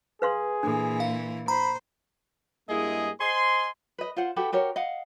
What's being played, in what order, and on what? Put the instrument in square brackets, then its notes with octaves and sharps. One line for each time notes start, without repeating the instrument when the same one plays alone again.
[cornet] G#4 [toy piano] B4 F5 C6
[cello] A#2 E3 [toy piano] D4 A4
[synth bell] F5
[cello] C5 [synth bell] A#5 [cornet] B5
[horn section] G2 G#3 A#3 E4 G#4 D#5
C5 D#5 G#5 C6
[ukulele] B4 D#5
F4 C5 F#5
F#4 G4 A4 B4
F#4 G4 A#4 C#5
D#5 F5 F#5